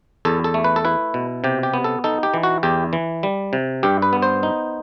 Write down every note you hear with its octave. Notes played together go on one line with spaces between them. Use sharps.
E2 A4
A4
A3
B4
A4
E4 B4
B2
C3 G4
G4
B3
A4
D#4 A4
G4
E3
F#4
E2 G4
E3
G3
C3
G2 G4
B4
B3
C5
D#4